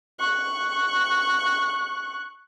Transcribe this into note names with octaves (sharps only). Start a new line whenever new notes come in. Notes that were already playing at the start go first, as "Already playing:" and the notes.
C#6 F#6